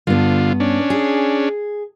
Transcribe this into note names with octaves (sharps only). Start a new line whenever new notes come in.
G2 D3 B3 F4
C#4 D4
G#4